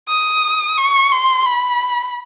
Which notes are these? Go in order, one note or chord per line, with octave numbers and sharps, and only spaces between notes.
D#6
C#6
C6
B5